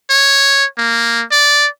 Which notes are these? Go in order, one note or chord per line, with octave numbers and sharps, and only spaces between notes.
C#5
A#3
D5